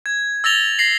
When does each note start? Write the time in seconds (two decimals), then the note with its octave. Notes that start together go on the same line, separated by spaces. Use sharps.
0.06 G#6
0.44 E6 A6 A#6 F7 G7
0.78 A#6 C7 F#7